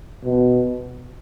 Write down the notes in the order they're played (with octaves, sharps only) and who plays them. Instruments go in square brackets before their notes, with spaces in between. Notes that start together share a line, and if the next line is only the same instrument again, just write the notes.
[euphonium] B2